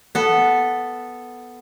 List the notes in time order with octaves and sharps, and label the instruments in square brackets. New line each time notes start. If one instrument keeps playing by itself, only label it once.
[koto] B3 A4